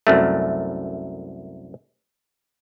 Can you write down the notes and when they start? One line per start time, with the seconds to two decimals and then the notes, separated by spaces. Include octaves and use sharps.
0.07 C2 F#2 A3